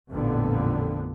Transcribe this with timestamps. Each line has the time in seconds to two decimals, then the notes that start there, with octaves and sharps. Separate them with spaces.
0.11 A1 F2 A#2 D3 B3